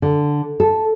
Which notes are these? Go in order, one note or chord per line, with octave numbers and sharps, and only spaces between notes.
D3
A4